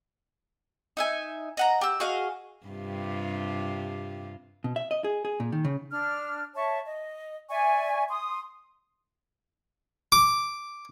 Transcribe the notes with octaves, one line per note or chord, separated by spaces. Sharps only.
D#4 E5 G#5
D#5 F#5 A#5
G4 E6
F#4 G#4 D#5 F5
G2 C3 F4
B2
E5
D#5
G#4
G#4
A#2
D#3
C#3
D4 F6
C#5 E5 A5 C#6
D#5
D5 E5 G#5 C#6
C6 D#6
D6